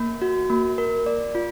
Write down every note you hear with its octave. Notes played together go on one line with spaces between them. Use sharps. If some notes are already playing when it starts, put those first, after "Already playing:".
Already playing: A#3
F#4
A#3
A#4
D5
F4